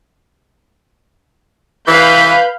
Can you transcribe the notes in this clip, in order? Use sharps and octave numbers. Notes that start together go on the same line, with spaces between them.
E3 B4 F5 B5 G6